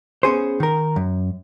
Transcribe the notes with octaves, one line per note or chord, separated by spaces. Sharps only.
B3 C#4 G#4 C5
D#3 A#4
F#2